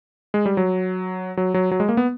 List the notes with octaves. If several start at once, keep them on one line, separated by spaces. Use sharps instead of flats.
G#3
G3
F#3
F#3
F#3
F#3
G#3
A#3
B3